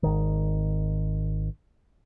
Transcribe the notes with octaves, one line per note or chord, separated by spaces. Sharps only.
G#1 D#3